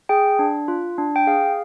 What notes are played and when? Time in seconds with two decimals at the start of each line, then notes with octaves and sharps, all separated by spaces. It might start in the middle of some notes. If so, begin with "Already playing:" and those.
0.09 G#4 G5
0.39 D4
0.68 F4
0.98 D4
1.16 G5
1.27 G#4 F5